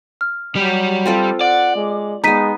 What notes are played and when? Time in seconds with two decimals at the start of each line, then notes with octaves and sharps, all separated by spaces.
0.21 F6
0.56 F#3 G3 G4
1.06 C4 F4 A4
1.41 D5 F#5
1.75 G#3
2.24 G#3 B3 D#4 A#5 B6 D#7